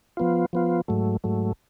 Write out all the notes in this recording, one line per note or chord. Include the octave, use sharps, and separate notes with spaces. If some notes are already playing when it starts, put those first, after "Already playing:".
F3 B3 F4
F3 B3 F4
G#2 F#3 A3
G#2 F#3 A3